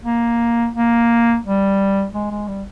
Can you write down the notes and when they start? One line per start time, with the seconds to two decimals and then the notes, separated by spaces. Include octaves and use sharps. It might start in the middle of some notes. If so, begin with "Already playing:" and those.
0.05 A#3
0.75 A#3
1.44 G3
2.13 G#3
2.31 G#3
2.48 G3